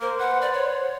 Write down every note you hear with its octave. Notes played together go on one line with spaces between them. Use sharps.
A#3 A#4 C5
B4 F#5
D5
C#5